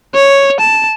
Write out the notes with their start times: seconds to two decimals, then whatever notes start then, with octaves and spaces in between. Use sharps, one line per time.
0.15 C#5
0.60 A5